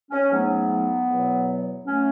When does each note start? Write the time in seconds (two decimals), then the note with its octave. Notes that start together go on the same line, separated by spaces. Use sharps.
0.11 C#4
0.30 G#2 F#3 A3 B3
1.08 E2 B2 F#3
1.85 F#3 A3 C#4